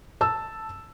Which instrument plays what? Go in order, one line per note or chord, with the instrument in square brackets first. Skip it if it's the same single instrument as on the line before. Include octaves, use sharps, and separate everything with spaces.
[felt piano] A5 E6